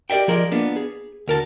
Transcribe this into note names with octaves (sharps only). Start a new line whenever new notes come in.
G4 A#4 D5 E5 G5
F3 G#4 A#4 D5 D#5
A#3 B3 D4 F4
G#4
D2 A#4 A5